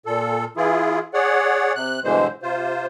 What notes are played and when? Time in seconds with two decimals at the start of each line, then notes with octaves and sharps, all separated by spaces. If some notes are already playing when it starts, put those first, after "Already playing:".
0.06 A#2 A4
0.57 E3 E4 F4 G#4
1.14 G#4 C#5 D5 F#5
1.76 C3 F#6
2.04 G2 B2 D3 E3 G#3 C5
2.42 C3 F4 C5